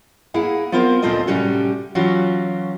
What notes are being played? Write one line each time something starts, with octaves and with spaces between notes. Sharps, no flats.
A#3 E4 G#4 F#5
B3 C4 F4 A#4 C5
D2 A#2 C4 F4 A4 D#5
A2 C3 G3 C#4 F#4
E3 F#3 C#4 F4 F#4